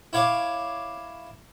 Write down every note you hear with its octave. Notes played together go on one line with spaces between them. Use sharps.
E4 C#5 F5 D6